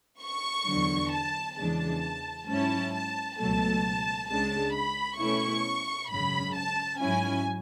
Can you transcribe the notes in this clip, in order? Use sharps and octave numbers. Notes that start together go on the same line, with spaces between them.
C#6
E2 D3 F#3
A5
E2 C#3 E3 G#3 D4 A5
G#2 F#3 C#4 E4 A5
A5
C#2 B2 F#3 A3 A5
C#2 C#3 G#3 D4 A5
B5
B2 A3 C#4 E4 C#6
G#1 F#2 C#3 B5
A5
G#2 F#3 C#4 E4 G#5